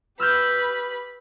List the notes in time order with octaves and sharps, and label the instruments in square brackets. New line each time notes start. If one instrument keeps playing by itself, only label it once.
[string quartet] G4 B4 B5 [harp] E6 F6 G6